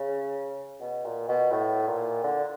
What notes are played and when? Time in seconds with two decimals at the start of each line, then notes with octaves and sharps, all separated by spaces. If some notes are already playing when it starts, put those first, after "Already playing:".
Already playing: C#3
0.80 B2
1.05 A#2
1.28 B2
1.52 A2
1.87 A#2
2.24 D3